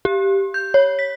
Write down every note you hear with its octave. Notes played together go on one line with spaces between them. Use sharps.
G4
G6
C#5
B6